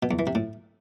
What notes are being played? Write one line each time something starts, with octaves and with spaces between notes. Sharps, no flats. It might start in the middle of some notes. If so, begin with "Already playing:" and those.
B2
E2
E3
C3
A2